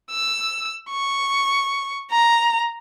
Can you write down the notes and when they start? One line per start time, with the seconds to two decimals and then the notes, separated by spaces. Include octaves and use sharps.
0.11 E6
0.90 C#6
2.11 A#5